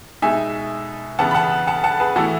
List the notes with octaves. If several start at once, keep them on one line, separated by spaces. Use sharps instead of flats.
B2 G#3 D#4 E5 G#5
C#3 E3 B3 F#5 A5
B5
F#5 A5
F#5 A5
F#5 A5
G#4 B4
A2 E3 B3 E4 F#4 A4